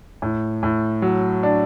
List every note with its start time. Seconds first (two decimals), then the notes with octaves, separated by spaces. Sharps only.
0.22 A2
0.63 A2
1.02 F#3
1.43 D4